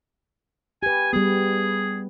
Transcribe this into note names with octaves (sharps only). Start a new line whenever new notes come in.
G4 B4 G#5
G3 B3 G#4